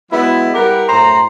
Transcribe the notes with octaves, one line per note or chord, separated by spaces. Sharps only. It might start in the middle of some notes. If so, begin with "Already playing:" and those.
F#3 G#3 B3 E4
G3 E4 G4 A#4 B4 F#5
F#2 A2 C5 A#5